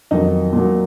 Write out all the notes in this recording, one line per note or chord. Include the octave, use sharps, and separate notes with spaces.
F2 D#3 F#3 D#4
A#2 F#3